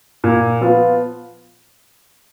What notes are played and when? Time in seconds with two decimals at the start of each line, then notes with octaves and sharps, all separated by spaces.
0.24 A#2
0.61 F3 B3 F4